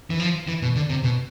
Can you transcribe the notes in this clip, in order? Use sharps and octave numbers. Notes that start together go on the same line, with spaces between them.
E3
F3
E3
B2
D3
C3
B2